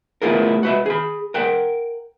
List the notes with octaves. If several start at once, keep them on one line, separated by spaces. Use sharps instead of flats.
A3 B3 E4 F4 G#4 A#4
F#4 B4 E5
G#4 B5
A#4 F#5 G5